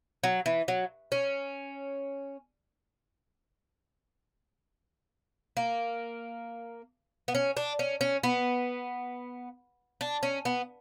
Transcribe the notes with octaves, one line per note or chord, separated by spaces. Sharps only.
F#3
E3
F#3
C#4
A#3
B3
C#4
D4
C#4
C#4
B3
D4
C#4
B3